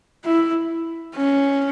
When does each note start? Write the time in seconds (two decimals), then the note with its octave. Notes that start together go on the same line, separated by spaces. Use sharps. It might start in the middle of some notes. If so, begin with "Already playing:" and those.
0.25 E4
1.16 C#4